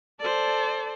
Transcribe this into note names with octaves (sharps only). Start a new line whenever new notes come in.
A4 C5 D5